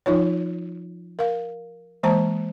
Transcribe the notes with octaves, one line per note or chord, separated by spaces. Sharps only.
F3 D#4 F4 C#5
A#4 F5
E3 G#3 A#3 C5 A5 A#5